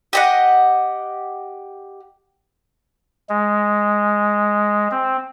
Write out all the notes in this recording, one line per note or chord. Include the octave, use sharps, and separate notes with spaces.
G4 D#5 F#5
G#3
C4